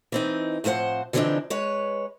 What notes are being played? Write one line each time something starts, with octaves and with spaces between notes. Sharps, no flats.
E3 C4 D#4
A2 F3 C4 C5 F#5
D3 E3 F3 C4 D4 D#4
G#3 B4 C#5